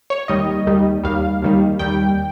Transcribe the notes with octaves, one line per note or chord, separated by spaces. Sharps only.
C#5
D#2 D#3 G3 D#5
D#2 D#3 G3
D#2 D#3 G3 F5
D#2 D#3 G3
D#2 D#3 G3 G5